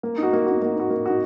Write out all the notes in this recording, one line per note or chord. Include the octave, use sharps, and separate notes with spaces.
A#3
D#4 F#4
A#3
D#4 F#4
A#3
D#4 F#4
A#3
D#4 F#4